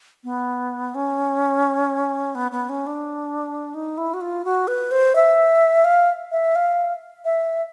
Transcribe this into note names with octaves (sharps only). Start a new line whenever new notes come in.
B3
C#4
B3
B3
C#4
D4
D#4
E4
F#4
F4
F#4
B4
C5
E5
F5
E5
F5
E5